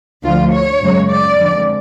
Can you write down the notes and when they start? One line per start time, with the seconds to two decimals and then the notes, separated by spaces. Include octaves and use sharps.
0.23 D2 D3 F3 F4
0.53 C#5
0.81 F#2 C#3 G#3
1.09 D5
1.38 F2 D3 G#3